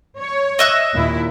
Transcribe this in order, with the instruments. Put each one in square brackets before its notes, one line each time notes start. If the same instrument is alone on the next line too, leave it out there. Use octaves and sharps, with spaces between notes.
[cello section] C#5
[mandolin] D#5 E5 F#6
[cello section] D#2 A#2 E4